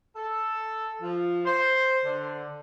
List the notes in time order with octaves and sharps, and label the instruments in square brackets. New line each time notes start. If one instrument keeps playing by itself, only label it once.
[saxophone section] A4
F3
C5
D3